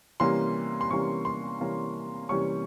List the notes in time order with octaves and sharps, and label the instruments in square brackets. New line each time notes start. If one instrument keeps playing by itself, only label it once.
[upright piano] C3 E3 G3 A#3 C#4 C6
C6
C3 E3 G3 A#3 C#4 C#6
C6
C3 E3 G3 A#3 C#4
C3 E3 G3 A#3 C#4 C#6